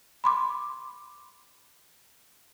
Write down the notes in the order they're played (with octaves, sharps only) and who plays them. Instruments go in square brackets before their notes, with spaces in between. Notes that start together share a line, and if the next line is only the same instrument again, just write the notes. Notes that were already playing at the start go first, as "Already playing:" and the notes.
[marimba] B5 C6 D6